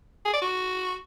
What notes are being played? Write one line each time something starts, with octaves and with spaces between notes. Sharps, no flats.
G#4
D5
F#4